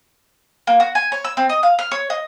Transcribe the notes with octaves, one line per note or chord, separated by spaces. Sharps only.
A#3
F#4
G#5
C#5
E6
C4
D#5
F5
F6
C#5
D#5